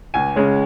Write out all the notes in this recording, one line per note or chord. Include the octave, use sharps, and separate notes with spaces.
C#2 G#5
C#3 G#3 C#4